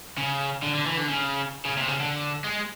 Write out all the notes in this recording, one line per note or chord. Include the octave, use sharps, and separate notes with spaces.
C#3
D3
D3
E3
D3
C#3
C#3
C3
C#3
D3
G#3